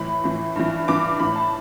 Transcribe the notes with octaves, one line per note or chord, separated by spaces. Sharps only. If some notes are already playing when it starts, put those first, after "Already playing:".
Already playing: A2 E3 B5
A2 E3
G2 E3
G2 E3 D6
A2 E3 B5
A5